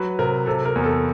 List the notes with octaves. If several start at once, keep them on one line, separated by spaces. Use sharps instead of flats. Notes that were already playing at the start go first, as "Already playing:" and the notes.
Already playing: F#3 B4
C3 A#4
C3 A4
A#4
E2
A4